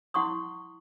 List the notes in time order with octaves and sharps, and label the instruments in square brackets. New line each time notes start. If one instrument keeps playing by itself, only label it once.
[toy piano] E4 F#5 C6 C#6 D#6